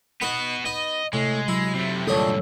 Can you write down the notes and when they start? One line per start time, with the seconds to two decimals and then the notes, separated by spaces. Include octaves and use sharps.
0.21 B3 D#4 F#4 B4 F#5
0.66 B3 D#4 D#5
1.13 A2 C3 G#3
1.48 F#3 E4
1.75 C3 A3
2.07 D2 G2 A#2 D4 A4 C#5 D#6